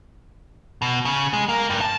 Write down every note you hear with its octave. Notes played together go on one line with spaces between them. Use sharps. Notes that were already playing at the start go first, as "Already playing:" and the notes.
B2
C#3
G#3
A#3
G2
A5